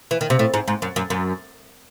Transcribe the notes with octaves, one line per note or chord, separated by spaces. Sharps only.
E3
D#3
C3
A2
G#2
G#2
F#2
F#2
F#2